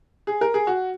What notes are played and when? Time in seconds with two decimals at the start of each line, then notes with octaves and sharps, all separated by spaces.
0.27 G#4
0.41 A#4
0.54 G#4
0.67 F#4